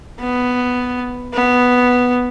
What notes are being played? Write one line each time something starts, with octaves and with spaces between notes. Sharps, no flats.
B3
B3